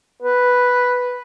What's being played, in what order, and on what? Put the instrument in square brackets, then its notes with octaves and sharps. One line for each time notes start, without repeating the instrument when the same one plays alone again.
[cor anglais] B4